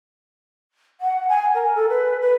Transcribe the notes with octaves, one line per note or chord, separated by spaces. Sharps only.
F#5
G#5
A#4
A4
B4
B4